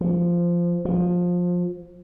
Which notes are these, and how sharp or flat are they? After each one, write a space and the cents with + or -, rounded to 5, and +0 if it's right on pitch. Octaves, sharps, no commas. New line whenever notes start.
F3 -10
F3 +20